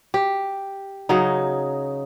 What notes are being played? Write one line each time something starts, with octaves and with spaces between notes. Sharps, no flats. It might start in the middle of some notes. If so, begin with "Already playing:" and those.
G4
C#3 F#3 D#4